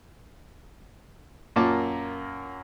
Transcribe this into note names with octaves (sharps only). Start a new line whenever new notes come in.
F#2 A#2 A#3 A5 D6